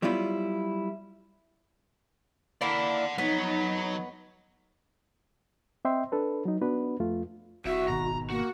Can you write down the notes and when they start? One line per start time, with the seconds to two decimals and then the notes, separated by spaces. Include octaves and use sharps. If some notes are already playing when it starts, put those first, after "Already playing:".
0.02 F#3 G3 B3 E4 F4
2.61 A#3 D4 E4 D5 F#5
3.18 F2 F#3 B3 D#4 C#5
5.85 C4 D#5 E5 G5 C6
6.12 D4 A4 B4
6.45 F#3 D#4
6.61 B3 D4 F#4 B4
7.00 F2 A3 F4
7.65 E1 C2 F#4 E5
7.88 G#1 B2 D#3 A#5
8.30 A#3 F#4